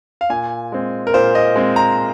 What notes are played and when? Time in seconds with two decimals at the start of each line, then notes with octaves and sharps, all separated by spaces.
0.21 F5
0.30 A#2 G#5
0.72 G#3 C4
1.07 A#4
1.14 A#2 C5
1.35 D#5
1.56 G#3 C4
1.76 A#5